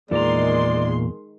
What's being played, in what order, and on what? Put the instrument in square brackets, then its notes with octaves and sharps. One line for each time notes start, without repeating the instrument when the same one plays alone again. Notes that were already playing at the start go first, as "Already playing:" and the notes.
[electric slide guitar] E2 A#5 [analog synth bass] A#2 [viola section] D#3 G#3 C6 [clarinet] D5